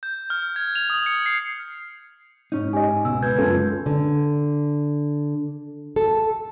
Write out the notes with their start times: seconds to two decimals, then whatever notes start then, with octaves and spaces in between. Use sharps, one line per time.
0.03 G6
0.30 F6
0.56 G#6
0.75 F7
0.90 D#6
1.06 C#7
1.26 C7
2.52 G#2 C#4 D#4
2.73 G4 D#5 G#5
2.88 G#5
3.05 C#2 B2 E6
3.23 B4 G6 G#6
3.38 C#2 F#2 G#3 C#4 F4 A4
3.86 D3
5.96 A4